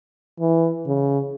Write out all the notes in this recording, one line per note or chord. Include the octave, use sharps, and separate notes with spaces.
E3
C#3